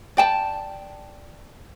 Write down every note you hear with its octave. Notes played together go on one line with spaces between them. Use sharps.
D5 G5 A5